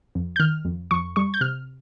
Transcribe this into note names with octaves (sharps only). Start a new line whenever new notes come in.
F2
G6
D#3 F6
F2
F2 C#6
G3 C#6
G6
C3 F6